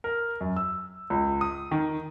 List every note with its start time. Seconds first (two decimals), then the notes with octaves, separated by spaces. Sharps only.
0.04 A#4
0.41 F#2
0.56 E6
1.10 C#2
1.41 D#6
1.71 D#3